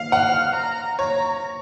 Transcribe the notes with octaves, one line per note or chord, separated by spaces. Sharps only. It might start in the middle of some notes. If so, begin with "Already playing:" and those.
Already playing: F5
F#5 F6
A#5
C#5 A#5